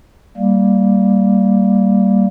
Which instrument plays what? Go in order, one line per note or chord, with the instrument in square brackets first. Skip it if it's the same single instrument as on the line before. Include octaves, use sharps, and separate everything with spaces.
[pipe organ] G3 A#3